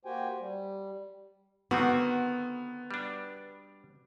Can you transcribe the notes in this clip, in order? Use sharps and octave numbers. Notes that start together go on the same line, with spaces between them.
A#3 F#4 G4 C5 G5 G#5
G3
D3 D#3 B3 C4 F#4
G3 D4